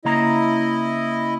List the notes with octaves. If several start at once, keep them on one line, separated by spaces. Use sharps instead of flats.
C#3 A#3 E4 D#5 A#5